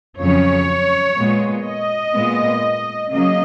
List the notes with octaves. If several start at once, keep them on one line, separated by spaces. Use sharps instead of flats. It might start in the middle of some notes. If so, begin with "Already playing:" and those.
F2 C#3 F#3 C#4 C#5
A#2 G#3 B3
D#5
A#2 G#3 B3
C#3 F#3 A#3 C#4 D#5